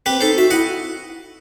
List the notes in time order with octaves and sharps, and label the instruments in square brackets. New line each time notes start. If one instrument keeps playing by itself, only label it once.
[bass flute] C4 [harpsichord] G4 B4
[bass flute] D#4 [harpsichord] A4 C5
[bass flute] F#4 [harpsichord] E5
[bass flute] E4 [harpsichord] D#5 F#5